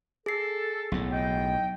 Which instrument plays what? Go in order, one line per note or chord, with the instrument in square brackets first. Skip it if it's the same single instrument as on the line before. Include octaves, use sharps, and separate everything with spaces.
[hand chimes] G#4 C7 [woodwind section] A4
[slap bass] B1 A2
[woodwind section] D#5 G5